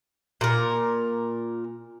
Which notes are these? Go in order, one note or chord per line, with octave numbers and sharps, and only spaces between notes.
A#2 A#4